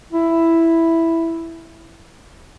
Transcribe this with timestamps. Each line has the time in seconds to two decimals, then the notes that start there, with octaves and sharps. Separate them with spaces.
0.12 E4